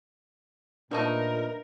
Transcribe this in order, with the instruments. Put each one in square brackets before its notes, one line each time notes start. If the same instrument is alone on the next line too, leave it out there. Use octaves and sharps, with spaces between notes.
[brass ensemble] A#2 [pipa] F3 A3 D#4 [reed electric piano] D4 B4 [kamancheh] A#4